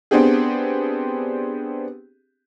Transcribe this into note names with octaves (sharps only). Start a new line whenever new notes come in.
B3 C4 D4 G4 G#4